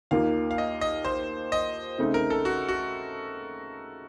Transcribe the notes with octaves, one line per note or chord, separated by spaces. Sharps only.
D#2 D#3 A#3 F4 F5
F5
D#5
D#5
C5
D#5
C#3 A3 C4 D#4
A#4
A4
F#4
F#4